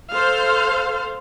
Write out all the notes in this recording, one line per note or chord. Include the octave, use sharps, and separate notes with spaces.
A4 C5 F5